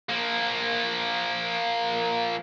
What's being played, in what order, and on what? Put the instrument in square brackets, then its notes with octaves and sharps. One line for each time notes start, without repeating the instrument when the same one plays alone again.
[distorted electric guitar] F3 A#3